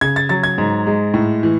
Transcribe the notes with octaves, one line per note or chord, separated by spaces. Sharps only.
C#3 G#6
A6
F#3 A6
G#6
G#2
G#3
A2
E3